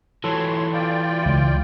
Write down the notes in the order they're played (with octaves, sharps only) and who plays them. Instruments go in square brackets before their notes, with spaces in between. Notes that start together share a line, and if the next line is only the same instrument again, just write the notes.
[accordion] A2 C#5 C6 [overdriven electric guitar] E3 F#3 [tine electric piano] A4
[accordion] F4 D5 G5
[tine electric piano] C#2 E4